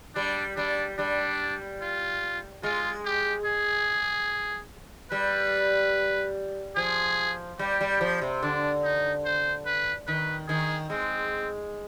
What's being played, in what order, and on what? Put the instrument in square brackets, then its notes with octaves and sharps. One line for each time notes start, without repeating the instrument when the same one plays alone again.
[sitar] G3 [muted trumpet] D4
[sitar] G3 [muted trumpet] D4
[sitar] G3 [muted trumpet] D4
[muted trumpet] F4
[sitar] G#3 [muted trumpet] F4
[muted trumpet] G4
G#4
[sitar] G3 [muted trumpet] B4
[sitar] F3 [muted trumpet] G#4
[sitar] G3 [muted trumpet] G4
[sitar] G3
F3
C3
[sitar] D3 [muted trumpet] D4
[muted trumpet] D#4
C5
B4
[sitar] D#3 [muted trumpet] B4
[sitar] D#3 [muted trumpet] G#4
[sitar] G#3 [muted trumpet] C4